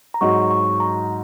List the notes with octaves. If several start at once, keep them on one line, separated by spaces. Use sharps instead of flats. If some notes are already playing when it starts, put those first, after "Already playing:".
A#5
G#2 F#3 D#4 F#4 D#5 C#6
C#6
A#5